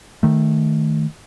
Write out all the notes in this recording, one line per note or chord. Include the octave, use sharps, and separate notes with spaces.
D#3 A3